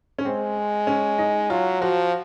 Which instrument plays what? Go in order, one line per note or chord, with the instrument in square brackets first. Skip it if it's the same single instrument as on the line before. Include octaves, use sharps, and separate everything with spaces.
[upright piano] C#4
[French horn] G#3 [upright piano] C4
[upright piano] C#4
D#4
[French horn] F#3 [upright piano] F4
[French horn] F3 [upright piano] F#4